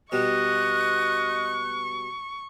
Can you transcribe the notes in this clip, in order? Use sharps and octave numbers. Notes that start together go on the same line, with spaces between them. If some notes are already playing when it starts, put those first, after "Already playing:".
B2 G3 D#5 C#6 F#6